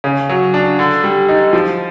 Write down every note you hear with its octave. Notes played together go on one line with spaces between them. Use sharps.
C#3
F#3
D4
D3
G3
D#4
F3